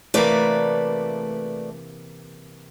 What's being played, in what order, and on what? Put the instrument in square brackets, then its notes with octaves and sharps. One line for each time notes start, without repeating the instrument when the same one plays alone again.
[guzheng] C3 E3 A#3 [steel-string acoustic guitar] A3 B4 D5